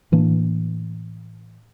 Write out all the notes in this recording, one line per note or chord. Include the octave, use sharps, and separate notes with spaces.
A2 E3 A#3 D4